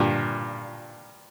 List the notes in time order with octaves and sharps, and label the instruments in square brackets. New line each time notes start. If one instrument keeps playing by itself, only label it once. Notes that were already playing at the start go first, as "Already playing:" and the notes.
Already playing: [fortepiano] G2 A#2